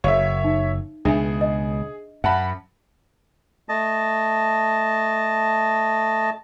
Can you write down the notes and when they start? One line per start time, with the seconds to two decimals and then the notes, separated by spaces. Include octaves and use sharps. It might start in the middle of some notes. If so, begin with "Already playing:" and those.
0.04 F#1 C#5 E5 F5
0.44 D#4
1.05 C#2 B2 D4 G#4 E5 B5
1.41 D#5
2.24 F#2 E5 F#5 A5 B5
3.69 A3 D#5 A5